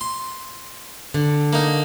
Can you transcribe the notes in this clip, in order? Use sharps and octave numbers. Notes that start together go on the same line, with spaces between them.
C6
D3
A#3 D#4